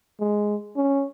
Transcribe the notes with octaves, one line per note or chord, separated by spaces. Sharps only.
G#3
C#4